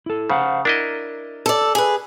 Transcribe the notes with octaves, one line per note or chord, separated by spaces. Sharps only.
E4 A4
C#3 C5 F5 F#5
D4 E4 A#4 D#5
A4 D5
G#4 B4